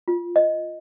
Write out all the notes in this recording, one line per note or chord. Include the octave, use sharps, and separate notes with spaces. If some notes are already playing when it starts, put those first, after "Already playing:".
F4
D#5